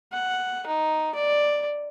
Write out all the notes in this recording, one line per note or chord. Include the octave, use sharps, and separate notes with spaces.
F#5
D#4
D5